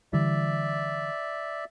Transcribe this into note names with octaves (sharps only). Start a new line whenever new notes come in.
D3 E3 G3 D5 E5